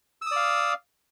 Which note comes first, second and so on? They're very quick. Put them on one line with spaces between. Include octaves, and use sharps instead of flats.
E6 D#6 D5 F5